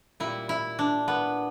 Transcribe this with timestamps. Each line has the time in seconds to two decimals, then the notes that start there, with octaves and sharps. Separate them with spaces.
0.20 A#2 G3 E4
0.49 E4
0.79 D4
1.08 B3